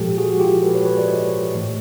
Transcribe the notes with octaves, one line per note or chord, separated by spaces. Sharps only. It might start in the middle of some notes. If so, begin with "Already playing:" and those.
Already playing: A#2 F3 G#3 G4 A4
F#4 G#4
F4 G4
A4 B4
B4 C#5
B4 C#5
C5 D5
C#5 D#5
A2 E3 A3